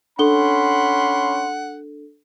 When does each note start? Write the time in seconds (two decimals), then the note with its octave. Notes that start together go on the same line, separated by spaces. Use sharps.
0.19 C#4 D4 A4 F#5 B5 C6 G7